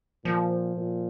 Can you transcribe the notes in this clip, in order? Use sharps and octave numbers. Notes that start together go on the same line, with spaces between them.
A#2 F3
A#2